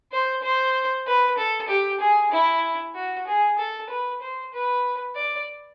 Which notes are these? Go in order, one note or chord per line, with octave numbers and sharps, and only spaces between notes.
C5
C5
B4
A4
G4
G#4
E4
F#4
G#4
A4
B4
C5
B4
D5